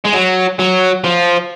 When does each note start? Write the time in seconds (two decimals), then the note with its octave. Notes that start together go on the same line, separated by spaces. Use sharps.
0.05 G#3
0.14 F#3
0.59 F#3
1.04 F3